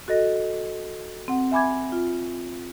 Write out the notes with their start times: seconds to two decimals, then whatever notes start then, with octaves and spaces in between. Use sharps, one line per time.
0.08 F#4 A4 D#5 A#6
1.28 C4 F#5
1.52 E5 G#5 B5 D6 G#6
1.92 F4